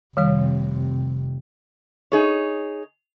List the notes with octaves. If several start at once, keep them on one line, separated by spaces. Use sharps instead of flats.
F1 C3 D#3 G3 C#5
D#4 G#4 C#5